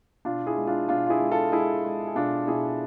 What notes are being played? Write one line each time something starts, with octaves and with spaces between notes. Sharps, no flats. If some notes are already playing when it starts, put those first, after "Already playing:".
B2 D4 F4
E4 G#4
G#3
D4 F4
B2 D4 F4
F4
E4 G#4
G#3
F4 A4
G#3 E4 G#4
G#3
G#4
B2 D4 F4
B2 E4 G#4